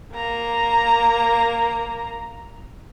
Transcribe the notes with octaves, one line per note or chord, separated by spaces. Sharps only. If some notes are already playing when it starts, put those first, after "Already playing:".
A#3 A#5